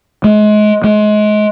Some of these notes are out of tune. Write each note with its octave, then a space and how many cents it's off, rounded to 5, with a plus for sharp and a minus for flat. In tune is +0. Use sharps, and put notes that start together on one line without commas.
G#3 +30
G#3 +30